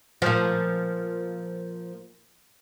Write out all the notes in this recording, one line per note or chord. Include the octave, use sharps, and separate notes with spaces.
A#2 F3